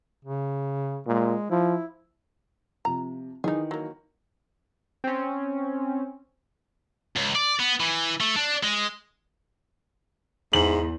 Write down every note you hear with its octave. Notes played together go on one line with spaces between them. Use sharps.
C#3
A#2 G#3
F3 E4
C3 F3 A#5
D#3 E3 D#4 G#4
F#3 A#3
C4 C#4
C#2
D5
B3
E3
A3
D4
G#3
E2 G#2 F#7